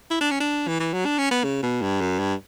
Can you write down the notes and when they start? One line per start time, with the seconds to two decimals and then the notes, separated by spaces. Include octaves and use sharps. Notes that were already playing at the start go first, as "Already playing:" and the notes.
0.11 E4
0.21 D4
0.31 C#4
0.40 D4
0.68 E3
0.80 E3
0.93 F#3
1.05 D4
1.18 C#4
1.31 B3
1.44 C#3
1.63 B2
1.82 G2
2.01 F#2
2.19 G2